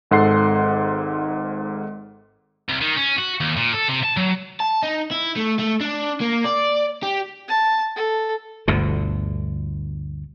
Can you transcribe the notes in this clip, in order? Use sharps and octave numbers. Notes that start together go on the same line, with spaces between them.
G#1 G#2 A4 F#5 C6 C7
C2
D#3
C#4
F#4
D#2
A#2
A4
C3
A5
F#3
A5
D#4
E4
A3
A3
D4
A#3
D5
G4
A5
A4
G1 D2 B2 D3